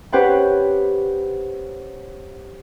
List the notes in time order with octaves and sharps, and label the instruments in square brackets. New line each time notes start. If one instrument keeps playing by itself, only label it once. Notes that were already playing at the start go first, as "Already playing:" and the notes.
[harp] C#4 G4 B4 C5 F#5 G5